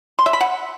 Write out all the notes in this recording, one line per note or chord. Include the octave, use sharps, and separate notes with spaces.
C6
E5
B5
F#5